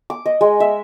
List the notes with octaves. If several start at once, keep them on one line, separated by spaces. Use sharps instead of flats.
D6
D#5
G#3
E5